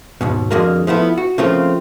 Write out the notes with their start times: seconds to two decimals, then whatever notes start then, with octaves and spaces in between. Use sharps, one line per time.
0.21 D#2 G#2 B2
0.51 F2 D3 G#3 A#3 F#4 A#4
0.87 F3 A3 B3 E4
1.18 F#4
1.38 C#3 F3 A3 A#3 C4 F4